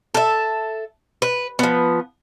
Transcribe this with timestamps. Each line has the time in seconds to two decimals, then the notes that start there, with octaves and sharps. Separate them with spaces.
0.14 A4 E5
1.22 B4
1.59 F3 B3